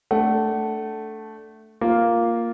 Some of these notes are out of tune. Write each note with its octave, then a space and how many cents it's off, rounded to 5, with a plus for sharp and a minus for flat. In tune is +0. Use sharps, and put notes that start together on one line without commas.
A3 +0 D4 -10 F#5 +30
A#3 +0 F4 +0